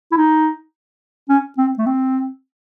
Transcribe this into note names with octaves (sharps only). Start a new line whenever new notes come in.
E4
D#4
C#4
C4
A3
C4